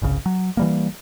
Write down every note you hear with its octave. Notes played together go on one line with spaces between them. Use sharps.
G1 C2 C#3
F#3
E3 G3 A#3